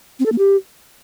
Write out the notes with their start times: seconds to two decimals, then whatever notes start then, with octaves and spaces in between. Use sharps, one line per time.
0.19 C4
0.26 A4
0.32 A#3
0.38 G4